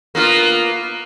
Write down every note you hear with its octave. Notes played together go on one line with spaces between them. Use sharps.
A#3 B3 F4